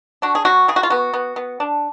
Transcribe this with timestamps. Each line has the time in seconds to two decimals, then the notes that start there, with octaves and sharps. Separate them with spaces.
0.22 D4 F#4
0.35 G#4
0.45 F#3 F#4
0.68 C#3 G#4
0.76 F#4
0.83 F4
0.90 B3 F#4
1.14 B3
1.36 B3
1.60 D4